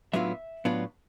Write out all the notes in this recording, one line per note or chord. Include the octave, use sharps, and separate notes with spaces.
A2 F#3 B3 D4 F4 E5
A2 F#3 B3 D4 F4